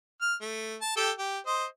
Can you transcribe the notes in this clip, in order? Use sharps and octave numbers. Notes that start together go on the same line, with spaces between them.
F6
A3
A5
G4 A4 G5
G4
C5 D#5